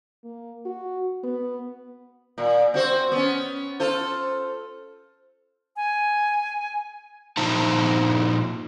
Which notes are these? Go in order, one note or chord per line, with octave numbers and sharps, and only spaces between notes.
A#3
F#4
B3
A#2
C4 F#4 C5
B3 C#4
F4 A4 C5
G#5
A#2 F3 D#4 C5 A5